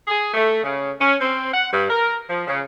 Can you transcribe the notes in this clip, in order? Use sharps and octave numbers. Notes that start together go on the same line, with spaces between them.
G#4
A3
C#3
C#4
C4
F#5
G2
A#4
F3
C#3